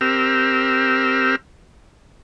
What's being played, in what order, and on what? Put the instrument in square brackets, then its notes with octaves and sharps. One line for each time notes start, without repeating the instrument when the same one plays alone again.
[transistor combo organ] C4 G4 A#4 E6 F6